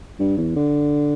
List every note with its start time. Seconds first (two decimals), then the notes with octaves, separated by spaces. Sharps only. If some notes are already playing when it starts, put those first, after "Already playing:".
0.20 G2
0.38 E2
0.56 D3